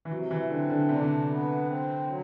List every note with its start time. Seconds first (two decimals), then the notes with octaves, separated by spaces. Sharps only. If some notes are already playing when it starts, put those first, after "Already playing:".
0.05 E3
0.11 C3 F#3
0.31 E3
0.50 D3 C4
0.70 D3
0.89 C3 D4
0.96 D3
1.04 C3
1.29 B3
1.66 C4
2.07 F#3